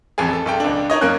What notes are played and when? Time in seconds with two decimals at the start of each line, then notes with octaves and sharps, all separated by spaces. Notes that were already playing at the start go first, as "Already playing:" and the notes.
0.18 A1 F2 G#4
0.33 A4
0.46 B1 A4 G5
0.60 C#2 D4
0.90 D4 D#4 C#5 D#5
1.01 F#2 A#3 C#4 F#6